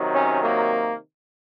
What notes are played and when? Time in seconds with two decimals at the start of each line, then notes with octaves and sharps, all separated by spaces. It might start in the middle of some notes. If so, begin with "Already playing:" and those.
Already playing: C3 D#3 F#3
0.12 C#4
0.42 A#3